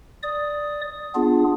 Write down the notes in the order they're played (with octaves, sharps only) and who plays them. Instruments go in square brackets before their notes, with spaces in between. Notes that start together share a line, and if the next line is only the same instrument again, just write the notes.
[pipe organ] D5 D#6
B3 D4 F4 G#4